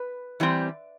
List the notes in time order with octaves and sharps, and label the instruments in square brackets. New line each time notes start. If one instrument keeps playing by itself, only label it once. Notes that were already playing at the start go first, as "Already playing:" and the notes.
Already playing: [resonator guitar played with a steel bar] B4
E3 G3 C4